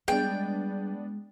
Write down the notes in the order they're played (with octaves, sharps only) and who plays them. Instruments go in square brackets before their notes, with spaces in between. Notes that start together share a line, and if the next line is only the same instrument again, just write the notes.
[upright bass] G3 [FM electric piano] G#3 [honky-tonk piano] B3 D4 [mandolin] G5